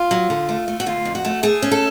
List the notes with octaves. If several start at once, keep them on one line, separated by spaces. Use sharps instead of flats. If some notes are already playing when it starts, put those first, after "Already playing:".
Already playing: F4
F#3
D3
A3
A3
F#4
D3 F4
F2
F#4
A3
A3 G#4
C#4
A4